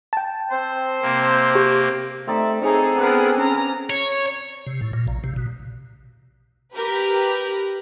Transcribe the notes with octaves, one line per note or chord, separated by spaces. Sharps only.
G5 A5
C4 C5
C3 A#3
G4
A3 C4 D#4 D5 E5
C4 D#4 G#4 A4 C#5 A#5
B3 D4 A#4 B4
C#4 A#5
C#5
C3
A2
A#2
A#1
C3
B2
G4 A#4 B4